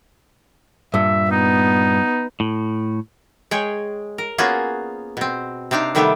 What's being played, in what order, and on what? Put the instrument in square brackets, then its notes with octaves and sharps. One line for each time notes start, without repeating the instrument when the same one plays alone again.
[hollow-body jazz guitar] G2 A#2 [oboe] E5
[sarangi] B3 [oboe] D#4
[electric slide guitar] A2
[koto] G#3 G#4 C#5 G5
A#4
A#3 B3 C#4 F4 F#4 G#4
B2 C4
C3 C4 D4 D#4 F5
C3 D#3 G3 A3 B3 G4